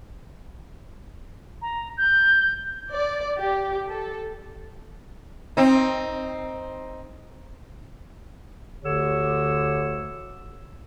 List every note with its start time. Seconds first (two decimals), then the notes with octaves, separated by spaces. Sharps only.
1.62 A#5
1.98 G6
2.92 D5
3.39 G4
3.89 A4
5.57 C4 D#4
8.84 D2 D3 G4 C#5 E6